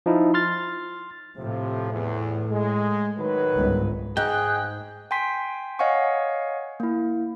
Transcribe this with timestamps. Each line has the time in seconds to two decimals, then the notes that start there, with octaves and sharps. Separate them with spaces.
0.06 F3 D#4 E4
0.34 C6 F6 A6
1.37 A2 C3 F3
1.92 E2
2.51 G#3
3.17 D#3 F#3 B4
3.56 G1 C#2 G#2
4.17 G#2 G#4 G5 F#6
5.11 G5 G#5 C6 B6
5.79 C#5 D#5 F5 F#5 G#5 C#6
6.80 A#3 E4